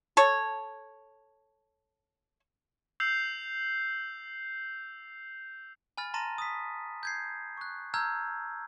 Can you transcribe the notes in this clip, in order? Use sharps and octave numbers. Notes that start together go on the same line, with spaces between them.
A4 C#5
E6 G6 C7 F7
G#5 B5 F6 A6
A5 A#5 C6 A6 A#6 D#7
D#6 B6
G6 G#6 C7
C#6 F#6
A5 A#5 E6 F6 G6 G#6